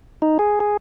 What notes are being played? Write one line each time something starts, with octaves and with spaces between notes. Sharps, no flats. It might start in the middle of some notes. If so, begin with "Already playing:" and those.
D#4
G#4
G#4